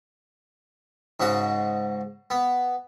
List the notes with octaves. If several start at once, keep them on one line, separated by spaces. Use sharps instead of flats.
G#2 C#3 F#4 D#6
B3